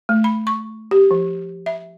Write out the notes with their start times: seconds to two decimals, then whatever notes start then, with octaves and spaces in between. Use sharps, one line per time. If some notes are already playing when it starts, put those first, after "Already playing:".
0.09 A3
0.24 B5
0.47 C#6
0.91 G4
1.11 F3
1.66 E5